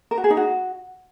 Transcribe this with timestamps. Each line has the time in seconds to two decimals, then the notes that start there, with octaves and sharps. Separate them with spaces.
0.11 A#4
0.18 F#4
0.24 G#4
0.30 D#4
0.37 F#4